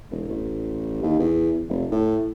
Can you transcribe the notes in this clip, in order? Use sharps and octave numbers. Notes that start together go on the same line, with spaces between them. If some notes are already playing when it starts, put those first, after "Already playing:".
E1
A1
D#2
E2
F1
A2